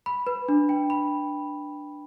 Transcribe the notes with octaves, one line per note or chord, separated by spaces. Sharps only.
B5
B4
D4
G5
B5